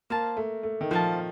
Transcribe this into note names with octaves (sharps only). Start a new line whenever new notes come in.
A#3 C5 F5 A5
A3
A3
D#3
F3 C5 F5 A5